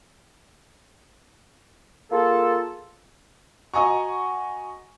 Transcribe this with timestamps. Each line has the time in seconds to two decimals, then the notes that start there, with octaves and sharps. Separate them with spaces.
2.12 A#3 F4 G#4 A4
3.74 F#4 D#5 G#5 A#5 C#6